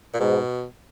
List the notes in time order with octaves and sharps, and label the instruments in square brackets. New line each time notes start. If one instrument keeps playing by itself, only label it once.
[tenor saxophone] A#2
[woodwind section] G#2 [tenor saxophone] B2